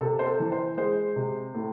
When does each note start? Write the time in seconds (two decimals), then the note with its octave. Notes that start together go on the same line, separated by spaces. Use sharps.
0.01 C3 A4
0.19 C5
0.26 A4
0.40 E3
0.52 C5
0.77 G#3 C5
1.16 C3
1.55 A2